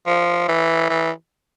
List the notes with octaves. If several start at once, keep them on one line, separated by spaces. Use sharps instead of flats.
F3
E3
E3